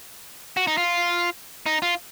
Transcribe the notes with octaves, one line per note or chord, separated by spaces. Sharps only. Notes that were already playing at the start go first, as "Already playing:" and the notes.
F#4
D#4
F4
D#4
F4